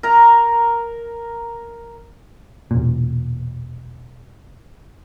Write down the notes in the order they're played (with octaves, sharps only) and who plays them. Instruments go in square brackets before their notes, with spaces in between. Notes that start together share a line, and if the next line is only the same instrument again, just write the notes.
[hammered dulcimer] A#4 A#5
[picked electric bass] E1 A#2